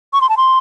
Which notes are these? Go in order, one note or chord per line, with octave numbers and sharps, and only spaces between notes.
C#6
C6
A5
C6